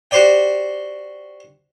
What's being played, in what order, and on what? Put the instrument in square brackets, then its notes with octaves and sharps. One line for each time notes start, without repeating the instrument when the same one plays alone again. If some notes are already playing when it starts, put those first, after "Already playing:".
[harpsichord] F#4 G4 C5 D5 G5